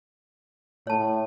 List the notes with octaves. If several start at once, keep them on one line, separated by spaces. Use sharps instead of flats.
A2 C#5 A5